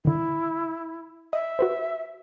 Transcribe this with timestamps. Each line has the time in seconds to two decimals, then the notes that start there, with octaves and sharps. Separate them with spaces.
0.05 D3 D#3 E4
1.33 D#5 E5
1.59 F#4 B4 C5